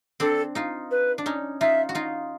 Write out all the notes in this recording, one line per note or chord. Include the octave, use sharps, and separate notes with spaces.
C4 D4 A4
D#4 F4
B4
D4
C#4 D#4
D#4 F4 E5
F#4
D#4 F4